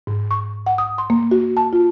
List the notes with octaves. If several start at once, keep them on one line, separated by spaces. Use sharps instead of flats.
G#2
C#6
F#5
D#6
C6
A#3
F#4
A5
F4